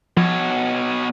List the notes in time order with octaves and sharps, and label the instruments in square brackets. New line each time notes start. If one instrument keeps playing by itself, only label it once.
[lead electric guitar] B2 C#5 [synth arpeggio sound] F3